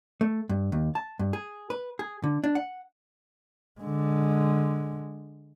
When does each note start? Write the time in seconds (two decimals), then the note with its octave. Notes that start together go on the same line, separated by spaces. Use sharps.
0.21 A3
0.49 G2
0.72 D#2
0.95 A5
1.19 G2
1.33 G#4
1.70 B4
1.99 G#4
2.24 D3
2.44 D4
2.55 F#5
3.80 D3 G#3